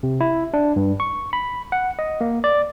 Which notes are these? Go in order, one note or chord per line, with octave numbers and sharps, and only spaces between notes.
C3
E4
D4
G2
C#6
B5
F#5
D#5
A#3
D5